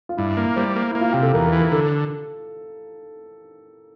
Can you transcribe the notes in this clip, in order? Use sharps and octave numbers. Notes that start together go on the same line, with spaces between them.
F4
G2 E4
A#3
G3 C5
A#3
A#3 E4
F4
C3 G4
A4
E2 A#4
A#4
E3
A#4
D3 A4